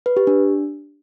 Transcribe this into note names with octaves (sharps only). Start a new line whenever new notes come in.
B4
G4
D4